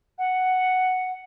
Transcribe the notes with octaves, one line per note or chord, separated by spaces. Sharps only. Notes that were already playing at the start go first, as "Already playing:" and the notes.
F#5